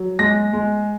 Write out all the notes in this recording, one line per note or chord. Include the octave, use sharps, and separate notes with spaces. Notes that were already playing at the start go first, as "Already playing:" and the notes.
Already playing: F#3
G#3 A#6
G#3